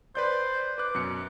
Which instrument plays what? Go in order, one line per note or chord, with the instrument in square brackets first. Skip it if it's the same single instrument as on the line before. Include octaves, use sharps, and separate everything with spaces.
[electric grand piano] B4 D5 G6 [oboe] C5
[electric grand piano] B4 F#6 [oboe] D6
[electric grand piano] F#2 B2 C#7